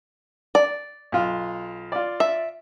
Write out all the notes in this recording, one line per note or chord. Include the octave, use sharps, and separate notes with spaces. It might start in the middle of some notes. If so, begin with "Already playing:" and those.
D5
B1 F4
F4 D5
E5